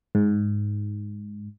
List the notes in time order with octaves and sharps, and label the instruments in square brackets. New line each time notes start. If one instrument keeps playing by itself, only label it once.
[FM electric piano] G#2